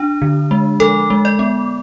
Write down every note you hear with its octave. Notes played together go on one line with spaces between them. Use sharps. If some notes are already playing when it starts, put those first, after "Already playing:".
Already playing: D4
D3
G#3
F3 A4
G#3
D5
B3